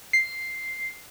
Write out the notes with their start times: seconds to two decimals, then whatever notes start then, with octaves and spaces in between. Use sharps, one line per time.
0.13 C7